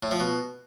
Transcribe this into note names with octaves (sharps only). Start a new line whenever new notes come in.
A2
F3
B2